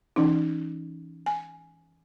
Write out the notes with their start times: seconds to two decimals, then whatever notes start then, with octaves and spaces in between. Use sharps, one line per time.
0.16 E3 C#4 D#4
1.26 G#5